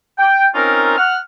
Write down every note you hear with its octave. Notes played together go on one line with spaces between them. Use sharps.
G5
C4 C#4 D#4 F4 A#4
F#5 F6